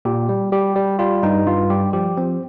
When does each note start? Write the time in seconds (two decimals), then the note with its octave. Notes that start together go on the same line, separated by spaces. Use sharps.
0.05 A#2 G4
0.29 G3
0.52 G3 G4
0.76 G3
0.99 G3 F4
1.23 G2 D#4
1.46 G2 F4
1.70 G3 G4
1.93 F3 G4
2.17 F3 C4